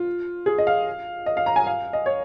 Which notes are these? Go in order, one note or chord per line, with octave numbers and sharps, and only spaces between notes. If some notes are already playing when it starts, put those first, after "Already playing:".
Already playing: F4
G#4
D#5
F5
D#5
F5
A#5
G#5
F5
D#5
C#5